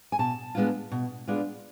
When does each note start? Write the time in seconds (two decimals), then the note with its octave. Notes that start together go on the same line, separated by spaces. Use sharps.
0.12 G#5
0.19 B2 A5
0.55 G#3 B3 D4 F4
0.92 B2
1.27 G#3 B3 D4 F4